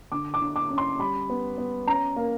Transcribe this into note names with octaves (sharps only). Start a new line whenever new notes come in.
D3 D6
D6
D3
D6
C#4
C6
G3 B5
B3
B3
C#4 A#5
A#3